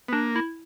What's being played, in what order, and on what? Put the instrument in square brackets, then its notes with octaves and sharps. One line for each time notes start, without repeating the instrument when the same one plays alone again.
[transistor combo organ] B3
[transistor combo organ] A#3 [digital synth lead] D4
[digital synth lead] E4